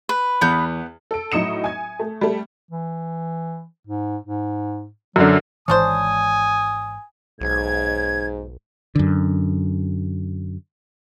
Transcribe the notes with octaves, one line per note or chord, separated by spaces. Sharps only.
B4
E2 B3 G6
A4 D7
A2 F#3 D#4 D#6 C#7 E7
G#5 G#6
A3
G3 A3
E3
G#2
G#2
F#2 D3 F#3
G#1 G#2 E3 C#4 D4 C5 G#5 D#6
B1 G#2 G#6
F#2 D3